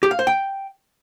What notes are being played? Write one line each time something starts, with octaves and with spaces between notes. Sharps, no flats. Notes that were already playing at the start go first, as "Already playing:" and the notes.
G4
F5
C5
G5